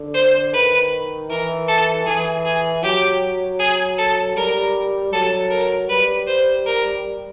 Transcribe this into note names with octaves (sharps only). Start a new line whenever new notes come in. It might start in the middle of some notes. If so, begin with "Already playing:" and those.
Already playing: D3
C5
D#3 B4
E3 A#4
A4
E3 G#4
G#4
F#3 G4
G#4
A4
G3 A#4
F#3 A4
A#4
G3 B4
C5
A#4